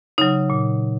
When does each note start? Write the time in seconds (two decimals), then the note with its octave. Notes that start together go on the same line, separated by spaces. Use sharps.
0.18 C#3 F#3 D#4
0.50 A#2